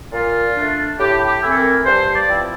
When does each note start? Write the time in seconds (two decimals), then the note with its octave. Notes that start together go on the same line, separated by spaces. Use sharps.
0.12 A#2 F4
0.55 A3 D4
0.98 A2 G4
1.27 G4
1.42 E3 A3 C4 E4
1.51 A4
1.56 A#4
1.85 G2 C5
2.14 D5
2.28 F3 C4 E4